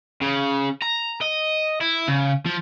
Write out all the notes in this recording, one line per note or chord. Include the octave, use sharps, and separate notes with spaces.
C#3
A#5
D#5
E4
C#3
F3